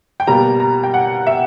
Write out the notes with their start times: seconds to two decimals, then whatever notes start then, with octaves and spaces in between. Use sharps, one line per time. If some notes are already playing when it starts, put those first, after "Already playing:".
0.20 G5
0.27 B2 G3 A#3 A#5
0.60 A#5
0.83 G5
0.94 F#5
1.27 E5